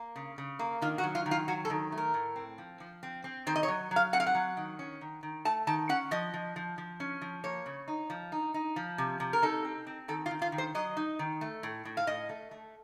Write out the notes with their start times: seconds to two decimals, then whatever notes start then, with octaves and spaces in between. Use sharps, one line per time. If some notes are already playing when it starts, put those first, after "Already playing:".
Already playing: A#3
0.16 C#3
0.38 C#3
0.59 A#3
0.82 D#3 F4
0.98 F#4
1.04 F#3
1.15 F4
1.26 D#3
1.31 F4
1.48 F#3 F#4
1.65 A4
1.70 D#3
1.92 A3
1.97 A#4
2.14 A2
2.36 C4
2.58 F3
2.80 F3
3.03 C4
3.24 C4
3.47 D#3 C5
3.56 D#5
3.63 C#5
3.68 F#3
3.91 F#3
3.96 F5
4.13 C4 F#5
4.20 F5
4.27 F#5
4.35 F#3
4.57 D#3
4.79 C#4
5.01 D#3
5.23 D#3
5.45 A3 A5
5.67 D#3 A5
5.89 C#4 F#5
6.11 F3 D#5
6.34 F3
6.56 F3
6.78 F3
7.00 C#4
7.22 F3
7.44 A#3 C#5
7.66 C#3
7.88 D#4
8.10 F3
8.32 D#4
8.54 D#4
8.76 F3
8.98 C3
9.20 C3
9.33 A#4
9.42 D#4 A4
9.65 C4
9.87 C4
10.08 D#3 A4
10.26 F4
10.31 D#3
10.42 F4
10.52 D#3
10.58 C5
10.75 F#3 D#5
10.97 D#4
11.19 D#3
11.41 A3
11.63 A2
11.85 A2
11.97 F5
12.07 A2 D#5
12.29 A3
12.51 A3